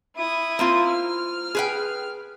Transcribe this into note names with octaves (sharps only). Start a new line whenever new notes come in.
E4 D#6
A#3 C4 F4
F6
G#4 B4 G5